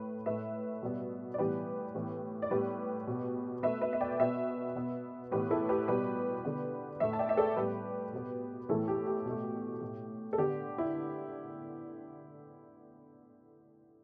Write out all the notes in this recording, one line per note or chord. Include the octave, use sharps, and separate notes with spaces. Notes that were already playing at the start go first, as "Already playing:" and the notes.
Already playing: A2 A3 B4
A2 A3 B4 E5
B2 G3 B3
D5
A2 E3 G3 B3 G4 B4
A2 E3 B3
D5
A2 G3 B3 G4 B4
B2 B3
B2 A3 B4 E5
B4 E5
E5
D5 G5
B2 B3 B4 E5
B2 B3
A2 E3 B3 G4 B4
E4 A4
G4 B4
B2 G3 B3 G4 B4
D3 B3
A2 A3 B4 E5
A5
D5 G5
E5
A4 D5
A2 G3 B3 G4 B4
B2 B3
A2 E3 A3 E4 A4
G4
G4
B2 A3
A2 A3
A4
D3 B3 G4
E4